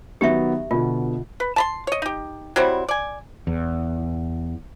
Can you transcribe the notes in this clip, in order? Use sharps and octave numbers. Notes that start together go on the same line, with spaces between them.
D#3 F#3 B3 G4 E5
B2 D3 F4
B4
A5 B5 C6
C#5 D#5
D#4 G4
F#3 G3 C4 E4
D5 G#5
E2